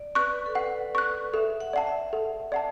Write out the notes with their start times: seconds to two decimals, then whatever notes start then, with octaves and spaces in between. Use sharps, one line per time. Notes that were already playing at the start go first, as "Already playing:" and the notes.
Already playing: D5
0.15 B4 C#6 F#6
0.46 A4
0.55 B4 F#5
0.95 C#6 F#6
1.33 A4 E5
1.61 F#5
1.73 D5 F#5 A5
1.87 E5
2.13 A4
2.52 D5 F#5 A5